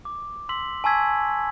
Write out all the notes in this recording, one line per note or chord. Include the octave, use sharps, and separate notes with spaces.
D6
C6 E6 B6 F#7
G#5 A5 C#6 E6 G#6 B6